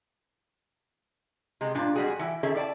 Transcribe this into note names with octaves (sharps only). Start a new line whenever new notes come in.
C3 G#3
G2 A#2 D4 F4
F2 G3 G#3 F#4 G#4
E3 E4 G5
D#3 C#4 G#4 A4 E5
E4 D5 G5 A5